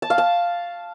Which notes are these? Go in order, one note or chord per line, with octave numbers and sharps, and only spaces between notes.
A5
F5
A5